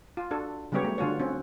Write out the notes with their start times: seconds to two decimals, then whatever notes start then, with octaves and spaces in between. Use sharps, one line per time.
0.17 F4
0.31 D4 F#4 A4
0.72 C#3 F#3 G3 B3 G4 C#5
0.85 A3
0.98 D3 F4 F#4 C#5
1.20 C4 C#4 F#4